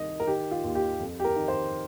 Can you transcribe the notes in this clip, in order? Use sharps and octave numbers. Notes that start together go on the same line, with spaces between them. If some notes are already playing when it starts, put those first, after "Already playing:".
Already playing: C2 D#3 D#5
A#4
D#3 G4
F4
D#2
G4
F2
G4
A#4
D#3
C5